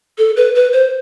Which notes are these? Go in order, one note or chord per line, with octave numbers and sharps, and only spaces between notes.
A4
B4
B4
C5